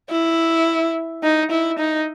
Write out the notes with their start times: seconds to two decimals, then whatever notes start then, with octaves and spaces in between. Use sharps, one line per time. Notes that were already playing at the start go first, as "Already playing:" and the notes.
0.11 E4
1.24 D#4
1.52 E4
1.79 D#4